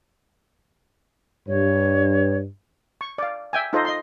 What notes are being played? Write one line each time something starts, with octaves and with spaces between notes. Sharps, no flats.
G2 C#5
C#6
D5 F5
E5 G5 G#5
D#4 F4 A4 C5 D#5
D#5 C6